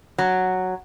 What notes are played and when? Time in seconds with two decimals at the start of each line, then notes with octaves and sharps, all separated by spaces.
0.18 F#3